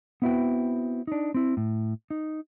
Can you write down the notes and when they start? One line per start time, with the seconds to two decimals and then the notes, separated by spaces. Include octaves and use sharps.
0.22 B3 C4 E4 F#4 B4 G5
1.07 D4 D#4
1.34 C4 E4
1.57 A2
2.10 D#4